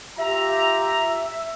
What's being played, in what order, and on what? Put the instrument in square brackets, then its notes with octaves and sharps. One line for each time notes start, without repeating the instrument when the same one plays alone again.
[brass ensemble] F4 G4 A#5 [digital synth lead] E5